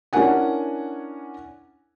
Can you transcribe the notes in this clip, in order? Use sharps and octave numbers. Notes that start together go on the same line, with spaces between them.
C#4 D4 E4 A#4 F#5 G#5